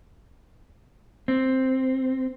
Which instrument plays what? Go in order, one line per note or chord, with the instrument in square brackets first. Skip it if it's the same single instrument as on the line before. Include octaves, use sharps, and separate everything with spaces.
[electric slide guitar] C4